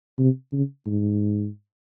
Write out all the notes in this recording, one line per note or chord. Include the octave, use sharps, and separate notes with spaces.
C3
C#3
G#2